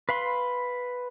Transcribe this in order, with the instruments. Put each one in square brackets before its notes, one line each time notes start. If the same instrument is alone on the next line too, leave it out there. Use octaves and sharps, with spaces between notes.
[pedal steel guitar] B4 F5 B5 C6